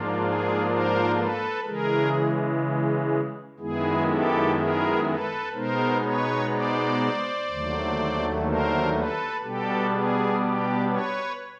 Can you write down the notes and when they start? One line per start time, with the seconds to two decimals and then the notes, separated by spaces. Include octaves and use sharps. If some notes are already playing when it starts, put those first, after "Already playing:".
Already playing: G#2 F3 A#3 D4 F4
0.19 G#4
0.68 A#4 C5
1.16 A4 B4
1.65 C#3 E3 G#3 G#4 A#4
3.59 F#2 D#3 G#3 B3 E4 G#4
4.08 G4 A4
4.56 G#4 A#4
5.05 A4 B4
5.54 B2 G#3 B3 D#4 A#4 C5
6.02 B4 C#5
6.51 C5 D5
7.48 D#2 D3 F#3 A3
8.46 A#4 C5
8.93 A4 B4
9.42 B2 G3 B3 D4 G4 A4
9.92 G#4
10.40 G4
10.89 B4 C#5